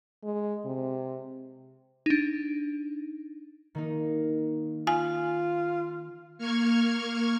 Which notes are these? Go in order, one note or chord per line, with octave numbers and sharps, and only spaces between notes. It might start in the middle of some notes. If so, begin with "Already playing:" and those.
G#3
C3
D4 D#4
D#3 A#3 D#4
F4 G#5
A#3 C#6 F6 G#6